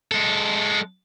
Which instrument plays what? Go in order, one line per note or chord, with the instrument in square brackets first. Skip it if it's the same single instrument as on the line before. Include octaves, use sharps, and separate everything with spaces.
[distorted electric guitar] G#3 A4